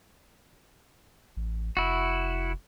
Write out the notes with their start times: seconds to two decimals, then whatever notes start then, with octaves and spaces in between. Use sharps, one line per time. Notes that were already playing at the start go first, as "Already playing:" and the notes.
1.37 A1
1.77 F1 E4 F#4